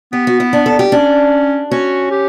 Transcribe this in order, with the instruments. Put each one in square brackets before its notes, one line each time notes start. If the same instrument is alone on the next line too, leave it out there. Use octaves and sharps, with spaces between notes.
[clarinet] B3 [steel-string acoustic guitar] G4
[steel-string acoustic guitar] F#4
E4
D4
A4
G4
[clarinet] C#4 [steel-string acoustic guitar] D4
[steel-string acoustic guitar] C#4 [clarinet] F#4
[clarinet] G4